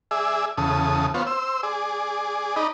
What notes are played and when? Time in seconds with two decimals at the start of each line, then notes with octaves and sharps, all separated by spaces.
0.11 G#4 D5 E5
0.57 E2 C#3 A4 D#6
1.14 B3 F4 C5 C#5
1.27 C5 E6
1.63 G#4 D5
2.56 D#4 D5 D#5 B5